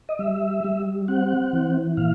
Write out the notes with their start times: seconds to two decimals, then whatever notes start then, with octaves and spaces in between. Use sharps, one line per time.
0.09 D#5
0.19 G3 E5
0.64 G3
1.08 C4 F#5
1.53 E3
1.97 A#2 F5